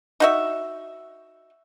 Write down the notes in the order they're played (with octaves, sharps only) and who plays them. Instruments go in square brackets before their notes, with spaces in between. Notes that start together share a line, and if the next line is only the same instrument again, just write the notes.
[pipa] D#4 F#4 E5